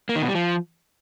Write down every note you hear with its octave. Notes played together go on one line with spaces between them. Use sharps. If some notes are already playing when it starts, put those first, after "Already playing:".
A#3
D#3
B2
G3
F3